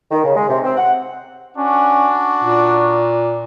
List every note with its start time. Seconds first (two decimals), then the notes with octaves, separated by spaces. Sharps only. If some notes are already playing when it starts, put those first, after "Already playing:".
0.11 D#3
0.24 C#3
0.36 G#3
0.50 C3
0.64 C4
0.77 F#5
1.57 C#4 D4 F#4
2.44 A#2